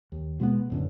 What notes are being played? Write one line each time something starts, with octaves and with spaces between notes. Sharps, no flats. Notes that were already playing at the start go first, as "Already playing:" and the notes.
D#2
B2 G#3 A3 B3
A1 F#2 D3